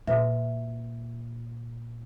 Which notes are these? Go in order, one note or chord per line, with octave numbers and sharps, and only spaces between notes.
A#2 F#4 B4 E5